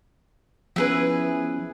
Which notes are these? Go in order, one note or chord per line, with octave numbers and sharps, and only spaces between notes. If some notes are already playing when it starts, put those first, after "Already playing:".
F3 B3 C#4 E4 G#4 B4